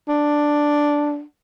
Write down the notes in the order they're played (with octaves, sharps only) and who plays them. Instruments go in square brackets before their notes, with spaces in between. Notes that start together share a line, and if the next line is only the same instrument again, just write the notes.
[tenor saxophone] D4